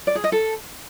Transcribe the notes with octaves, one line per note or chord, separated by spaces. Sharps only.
D5
G#4
D#5
A4